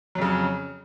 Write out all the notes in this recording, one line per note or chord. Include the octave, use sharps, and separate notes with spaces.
F2 C#3 F#3